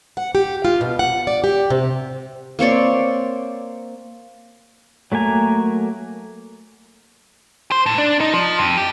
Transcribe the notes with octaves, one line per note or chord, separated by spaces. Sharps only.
F#5
G4
F4
B2
F#5
D5
G4
C3
A#3 C4 C#5 D5
F#3 A3 A#3 G#5 A#5
C5
A2
D4
D#4
F3
F2
G4